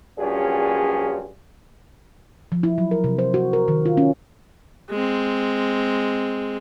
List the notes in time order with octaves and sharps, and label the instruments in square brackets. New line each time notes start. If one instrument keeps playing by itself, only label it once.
[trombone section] A#1 G2 F#3 C#4 F4 G#4
[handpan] F3
E4
F#3
A#4
C3
C5
F#4
A#4
D#3
F4
C#4
[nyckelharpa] G#3 C4